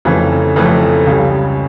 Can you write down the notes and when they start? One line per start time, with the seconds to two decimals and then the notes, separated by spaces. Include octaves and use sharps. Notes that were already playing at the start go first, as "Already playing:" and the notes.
0.05 F1 F2 C#3 E3 A3
0.56 F1 F2 C#3 E3 A3
1.07 C#2 C#3 G3